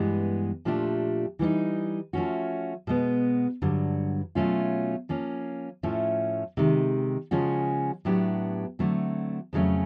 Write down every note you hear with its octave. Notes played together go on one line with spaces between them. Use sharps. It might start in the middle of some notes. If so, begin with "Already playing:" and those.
Already playing: G2 E3 G#3 B3
A#2 F3 A3 D4 G4
E3 G3 B3 D#4
F3 A3 C#4 F#4
B2 G#3 B3
G2 D3 F#3
B2 F#3 A3 C#4 F4
F3 A#3 C#4
A2 F3 A3 C#4
C3 D#3 G#3
C#3 F3 G#3 C#4 F#4
A2 F#3 B3 D4 G4
D3 F#3 A3 C4
F2 C#3 F#3 A3 C#4